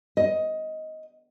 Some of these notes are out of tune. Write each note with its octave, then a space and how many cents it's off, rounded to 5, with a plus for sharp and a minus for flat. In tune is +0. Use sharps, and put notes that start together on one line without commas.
D#5 +15